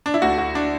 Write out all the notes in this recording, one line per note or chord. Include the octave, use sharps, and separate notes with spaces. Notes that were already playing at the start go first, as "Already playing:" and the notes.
D4
E4
D2 D3 F#4
F#4
D4